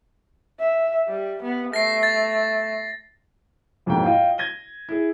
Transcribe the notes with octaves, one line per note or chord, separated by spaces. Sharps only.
E5
G3
B3
A3 A#6 C7
A6
E1 F2 G#2 B2 A#3 G5
F4 D#5 F5 G5
G#6 A#6 D#7 G7
E4 G#4